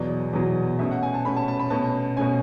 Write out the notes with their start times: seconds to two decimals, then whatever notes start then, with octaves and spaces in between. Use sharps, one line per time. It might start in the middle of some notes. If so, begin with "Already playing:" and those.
Already playing: E2 B2 F#3 D5
0.33 E2 B2 F#3
0.79 B2 A3 C#4 E5
0.91 F#5
1.03 G#5
1.14 A5
1.25 B2 A3 C#4 B5
1.37 A5
1.48 A5
1.59 B5
1.70 B2 A3 C#4 A5
2.17 B2 A3 C#4 G#5